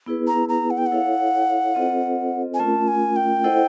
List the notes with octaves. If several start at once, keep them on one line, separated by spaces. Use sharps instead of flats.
B3 E4 G#4 B4
A#5
A#5
F#5
G5
F#5
E4 A4 C#5 F5
C4 F4 A4 C5 D#5
G#5
A3 C#4 F4 A#4 A5
G#5
G5
E4 A4 C5 D#5 F#5